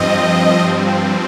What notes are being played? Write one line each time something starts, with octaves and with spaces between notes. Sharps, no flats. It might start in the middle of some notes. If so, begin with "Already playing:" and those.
Already playing: G2 F3 C4 D#5